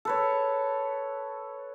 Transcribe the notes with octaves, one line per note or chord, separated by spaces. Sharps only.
A4 B4 C#5